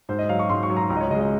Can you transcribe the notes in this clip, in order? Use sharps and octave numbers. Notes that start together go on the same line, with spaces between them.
G#2 C5
D#5
F#3 F5
C#6
G#2 C6
C#6
F#3
A#5
C#2 A#5
D#5
C#5
C#3 G#3 D#5
D#5